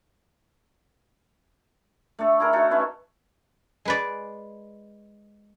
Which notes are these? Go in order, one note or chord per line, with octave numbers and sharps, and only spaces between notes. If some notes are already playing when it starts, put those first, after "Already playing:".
A3 D4 A4
E4 G#4 A#4
D#4 E4 F#4 A4
C#4 E4 B4 C#5
G#3 B4 D5